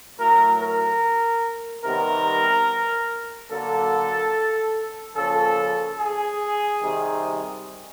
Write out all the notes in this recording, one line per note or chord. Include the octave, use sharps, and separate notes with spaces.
A2 F#3 A3 A#4
A#4
C3 D#3 G3 B3 A#4
D3 F#3 A#3 A4
C#3 F3 A#3 A4
G#4
C3 D#3 G3